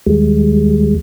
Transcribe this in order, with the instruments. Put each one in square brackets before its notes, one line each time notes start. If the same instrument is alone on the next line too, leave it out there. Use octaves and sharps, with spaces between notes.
[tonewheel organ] D#2 G3 G#3